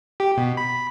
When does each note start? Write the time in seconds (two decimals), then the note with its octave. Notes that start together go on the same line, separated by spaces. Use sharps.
0.20 G4
0.37 B2
0.57 B5
0.70 B5